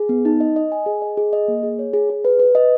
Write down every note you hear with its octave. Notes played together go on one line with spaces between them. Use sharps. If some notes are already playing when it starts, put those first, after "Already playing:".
Already playing: G#4
B3
D#4
D#5
D#5
G#5
G#4
D#5
G#4
D#5
A#3
G#4
C#5
G#4
G#4
B4
B4
D#5